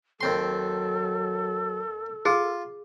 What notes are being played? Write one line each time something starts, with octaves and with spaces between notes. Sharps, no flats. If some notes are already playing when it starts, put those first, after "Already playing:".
D#2 F#3 C4 A4 C6
F4 G#4